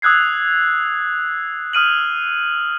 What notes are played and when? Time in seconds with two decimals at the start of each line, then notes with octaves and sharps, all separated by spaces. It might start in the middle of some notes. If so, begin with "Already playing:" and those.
0.02 D#6 E6 F#6 G#6 C7
1.73 D#6 F6 D#7 F#7